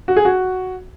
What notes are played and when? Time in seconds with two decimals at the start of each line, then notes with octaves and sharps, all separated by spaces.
0.08 F#4
0.16 G#4
0.25 F#4